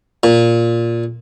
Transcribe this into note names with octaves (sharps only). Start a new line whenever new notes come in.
A#2